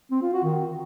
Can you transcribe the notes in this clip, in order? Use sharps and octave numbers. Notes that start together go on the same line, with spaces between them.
C4
F4
F#4
D#3